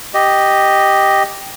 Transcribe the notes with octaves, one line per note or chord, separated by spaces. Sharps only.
G4 D#5